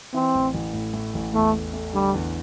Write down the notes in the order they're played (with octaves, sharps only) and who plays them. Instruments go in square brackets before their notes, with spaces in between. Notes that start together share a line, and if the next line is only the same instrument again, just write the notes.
[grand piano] E3 [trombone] C4
[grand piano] A1
A1
A2
A2
A1
[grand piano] E2 [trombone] A3
[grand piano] A3
A3
[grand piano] D3 [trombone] G3
[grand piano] E2